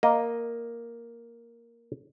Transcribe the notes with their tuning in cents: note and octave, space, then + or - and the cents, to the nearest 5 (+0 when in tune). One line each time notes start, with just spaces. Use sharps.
A#3 +0 D#5 +0